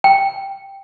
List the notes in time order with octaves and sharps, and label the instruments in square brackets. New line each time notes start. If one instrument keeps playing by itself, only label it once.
[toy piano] G5